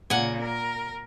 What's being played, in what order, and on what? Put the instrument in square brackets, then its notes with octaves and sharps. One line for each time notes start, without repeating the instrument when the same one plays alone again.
[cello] A#2 C#3 [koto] F#5 G#5
[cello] A#4